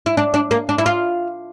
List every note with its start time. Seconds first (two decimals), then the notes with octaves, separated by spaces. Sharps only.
0.06 E4
0.17 D4
0.34 D4
0.51 A#3
0.69 D4
0.78 E4
0.86 F4